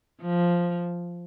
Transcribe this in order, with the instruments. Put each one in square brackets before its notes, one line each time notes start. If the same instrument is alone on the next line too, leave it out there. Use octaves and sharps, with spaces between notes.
[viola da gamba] F3